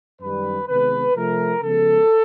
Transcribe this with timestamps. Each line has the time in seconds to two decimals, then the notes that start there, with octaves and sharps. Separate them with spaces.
0.20 F#2 D#3 G3 B4
0.67 C3 D#3 G#3 B3 B4
1.15 C3 F3 A3 A#4
1.62 C#3 F3 G#3 B3 A4